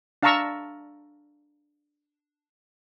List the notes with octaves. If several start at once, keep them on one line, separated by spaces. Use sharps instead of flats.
D4 F5 A5 A#5 C#6 E6